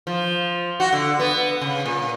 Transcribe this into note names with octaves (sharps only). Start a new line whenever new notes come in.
F3
F#4
D3
B3
C#3
A#2